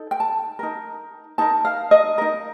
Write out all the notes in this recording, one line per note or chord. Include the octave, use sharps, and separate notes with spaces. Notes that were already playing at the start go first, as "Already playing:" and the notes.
Already playing: D#4 A4
G5
A5
D#4 A#4
D#4 A#4 A5
F5
D#5
D#4 A#4